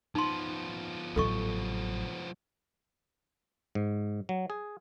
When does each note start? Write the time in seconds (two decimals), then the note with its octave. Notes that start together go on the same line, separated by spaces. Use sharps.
0.15 F3 B3 D#4 C6
1.16 A1 F#3 A4 D#5 C#6
3.75 G#2
4.29 F#3
4.50 G#4